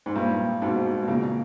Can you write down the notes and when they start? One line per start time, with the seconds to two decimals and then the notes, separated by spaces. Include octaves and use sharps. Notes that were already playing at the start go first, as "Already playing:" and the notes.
0.06 G#2
0.16 G2 A#2
0.62 G#2 B2
1.03 B2
1.08 A#2 C#3